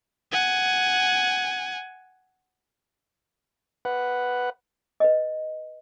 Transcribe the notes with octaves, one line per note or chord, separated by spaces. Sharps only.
F#5 G#5
B4 F#5
B4 D#5